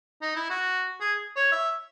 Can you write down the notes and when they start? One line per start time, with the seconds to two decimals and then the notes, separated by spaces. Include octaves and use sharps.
0.22 D#4
0.36 E4
0.50 F#4
1.01 G#4
1.36 C#5
1.52 E5